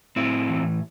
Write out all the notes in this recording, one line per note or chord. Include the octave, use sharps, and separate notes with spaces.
A2 C4 E4
E3